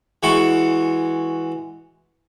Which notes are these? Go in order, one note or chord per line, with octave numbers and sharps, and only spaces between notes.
E3 G#3 F#4 C#6